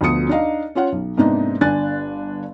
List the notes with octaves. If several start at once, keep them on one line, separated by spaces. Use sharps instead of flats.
D2 B2 F3 B3 D#6 C#7
D4 D#4 D#5 F5
C#4 F4 C#5 F#5
B1
G#2 C3 A#3 B3 D4 D#4
G1 D4 G#5 F#6 A6